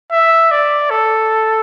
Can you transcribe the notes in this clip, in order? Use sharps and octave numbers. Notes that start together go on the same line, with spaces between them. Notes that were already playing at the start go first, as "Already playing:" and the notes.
E5
D5
A4